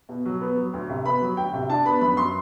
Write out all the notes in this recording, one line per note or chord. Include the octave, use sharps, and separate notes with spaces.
B2
F#3
B3
F#3
D2
C3
B3 B5
F#3
D2 G5
C3
D4 A5
B3 B5
F#2 B5
F#3 C6